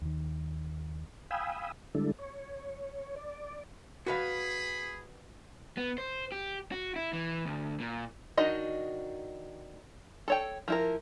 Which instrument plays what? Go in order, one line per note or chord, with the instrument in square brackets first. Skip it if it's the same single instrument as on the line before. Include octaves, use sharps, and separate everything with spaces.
[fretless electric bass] D#2 D#3
[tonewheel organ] F5 G5 G#5 B5 D#6 E6
D3 G3 G#3 D4 E4 A4
C#5
D5
[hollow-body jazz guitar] F#4 B4 F5 [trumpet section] G#4 B5
[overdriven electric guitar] B3
C5
G4
F#4
E4
E3
D2
A#2
[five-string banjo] D#3 D4 D#4 F#4 D#5
A4 C#5 G5
F3 E4 A#4